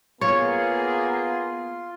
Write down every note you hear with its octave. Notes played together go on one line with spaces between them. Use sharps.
A#3 B3 F4 G#4 C#5 C6